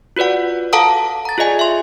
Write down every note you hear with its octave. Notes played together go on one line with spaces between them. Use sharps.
F4 F#4 B4 D5 F#5
A4 F5 F#5 A5 A#5 D#6
A#5 A6
F4 G#4 D5 D#5 G#5
E5 C6